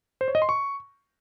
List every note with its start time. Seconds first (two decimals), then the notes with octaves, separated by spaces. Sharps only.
0.21 C5
0.28 C#5
0.35 D#5
0.42 C6
0.49 C#6